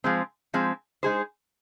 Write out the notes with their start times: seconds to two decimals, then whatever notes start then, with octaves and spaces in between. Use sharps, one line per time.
0.04 F3 G#3 C4
0.54 F3 G#3 C4
1.03 G#3 D#4 G#4 C5